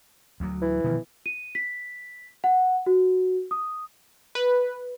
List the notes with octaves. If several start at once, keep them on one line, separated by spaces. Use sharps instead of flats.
D2 F#3
E3
B2 D#3 F3
D#7
B6
F#5
F#4
D#6
B4